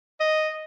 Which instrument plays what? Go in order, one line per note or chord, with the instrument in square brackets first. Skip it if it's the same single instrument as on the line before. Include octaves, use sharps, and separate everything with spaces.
[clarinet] D#5